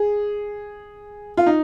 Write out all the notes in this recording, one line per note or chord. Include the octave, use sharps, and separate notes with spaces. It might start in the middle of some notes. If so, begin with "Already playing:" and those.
Already playing: G#4
F4
D#4